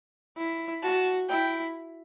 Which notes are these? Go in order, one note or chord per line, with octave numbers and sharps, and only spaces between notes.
E4
F#4 A5
E4 G5